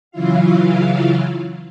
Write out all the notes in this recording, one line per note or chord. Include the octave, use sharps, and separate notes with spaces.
C#3 E3 F#3 E4 F4 F5